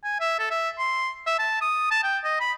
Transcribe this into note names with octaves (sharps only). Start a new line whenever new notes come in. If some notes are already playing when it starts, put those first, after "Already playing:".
G#5
E5
A4
E5
C6
E5
A5
D#6
A5
G5
D#5
B5